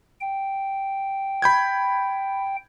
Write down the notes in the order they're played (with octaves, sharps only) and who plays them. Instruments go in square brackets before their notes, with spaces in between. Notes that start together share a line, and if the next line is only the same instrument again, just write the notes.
[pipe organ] G5
[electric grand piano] B5 G6 G#6